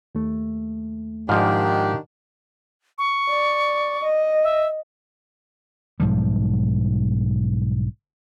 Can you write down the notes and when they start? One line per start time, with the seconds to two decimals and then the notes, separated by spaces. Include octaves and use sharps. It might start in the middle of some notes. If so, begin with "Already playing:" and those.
0.15 D#2 A3
1.29 G#2 D#3 F3 D4 G4 F5 F6
2.98 C#6
3.30 D5
4.04 D#5
4.44 E5
6.00 B1 G#2 F3 G3